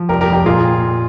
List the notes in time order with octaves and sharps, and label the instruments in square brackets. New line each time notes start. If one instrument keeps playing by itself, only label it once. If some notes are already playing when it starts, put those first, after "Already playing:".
Already playing: [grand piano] F3
F1 G4 A#4
G4 A#4
F2
G4 A#4
A#2 F4 G#4